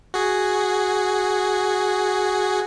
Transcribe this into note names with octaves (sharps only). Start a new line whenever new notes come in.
F#4 G#4